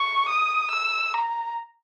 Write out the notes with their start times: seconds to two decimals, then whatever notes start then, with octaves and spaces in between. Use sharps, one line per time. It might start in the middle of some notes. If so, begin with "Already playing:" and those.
Already playing: C#6
0.28 D#6
0.70 E6
1.14 A#5